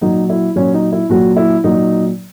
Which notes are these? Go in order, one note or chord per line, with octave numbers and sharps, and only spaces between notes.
A#2 F#3 D#4
E4
A#2 F#3 C#4
D#4
E4
A#2 F#3 F#4
E4
A#2 F#3 D#4